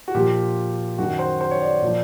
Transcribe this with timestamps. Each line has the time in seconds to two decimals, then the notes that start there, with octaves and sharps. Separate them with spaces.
0.08 F#4
0.14 A#2 F3 G4
0.98 F#2 D#3 F#4
1.19 C5
1.41 C5
1.51 C#5
1.61 D5
1.82 A#2 F3